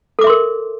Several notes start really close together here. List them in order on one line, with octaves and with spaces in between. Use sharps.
A4 D6 E5 C6 A#4